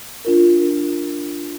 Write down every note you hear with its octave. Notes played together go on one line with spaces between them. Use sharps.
D4 F4 A#4